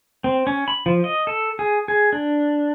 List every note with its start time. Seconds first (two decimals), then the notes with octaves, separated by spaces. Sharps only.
0.24 C4
0.47 C#4
0.68 B5
0.86 F3
1.04 D#5
1.27 A4
1.59 G#4
1.88 G#4
2.13 D4